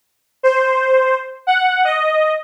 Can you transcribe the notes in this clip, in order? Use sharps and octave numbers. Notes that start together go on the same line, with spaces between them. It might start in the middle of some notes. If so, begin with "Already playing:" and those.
C5
F#5
D#5